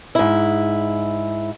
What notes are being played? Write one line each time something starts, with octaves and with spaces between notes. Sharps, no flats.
G#2 E4